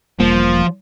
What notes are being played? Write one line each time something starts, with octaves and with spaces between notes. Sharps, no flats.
E1 F3 G3 A#3